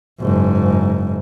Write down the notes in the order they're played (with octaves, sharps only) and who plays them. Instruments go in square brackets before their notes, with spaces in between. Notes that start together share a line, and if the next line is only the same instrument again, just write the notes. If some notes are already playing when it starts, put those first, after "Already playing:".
[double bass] F#1 G#2